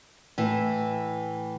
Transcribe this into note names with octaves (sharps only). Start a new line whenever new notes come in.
A2 E3